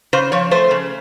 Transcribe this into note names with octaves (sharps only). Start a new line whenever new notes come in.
C#3 C5
F3 C#5
A3 C5
C#3